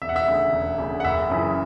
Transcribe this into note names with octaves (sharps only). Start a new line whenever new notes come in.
E1 E5
F#5
E5
D2 C#3
E1
D2 C#3
F#5
F#1 E5
F#2 C#3 E3